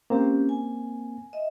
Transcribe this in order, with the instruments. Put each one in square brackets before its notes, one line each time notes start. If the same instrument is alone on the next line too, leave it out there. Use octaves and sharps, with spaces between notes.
[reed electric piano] A#3 C4 [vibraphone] C#4 G4
[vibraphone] G#5
D#5 E5